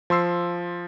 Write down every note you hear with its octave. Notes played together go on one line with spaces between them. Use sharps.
F3 C6 E6 C7